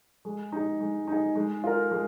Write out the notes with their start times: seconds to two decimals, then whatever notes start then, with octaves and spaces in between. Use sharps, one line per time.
0.25 G#3
0.52 D#4 G#4
0.80 G#3
1.08 D#4 G#4
1.36 G#3
1.64 F4 A#4
1.91 G#3